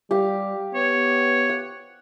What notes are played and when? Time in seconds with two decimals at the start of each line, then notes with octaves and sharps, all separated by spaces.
0.11 G3 G4 F5
0.75 B3 C#5
1.50 F#5